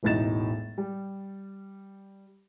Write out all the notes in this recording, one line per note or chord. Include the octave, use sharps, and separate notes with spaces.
E1 A1 A2 D#4 A6 E7
G3